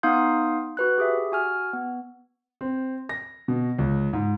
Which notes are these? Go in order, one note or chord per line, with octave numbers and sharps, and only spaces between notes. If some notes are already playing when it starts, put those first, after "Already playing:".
B3 D#4 F5 C6 D#6 G6
F#4 B4 F#6
G4 G#4 E5
F#4 G#5 F6
B3
C4
A#6
B2
C#2
G#2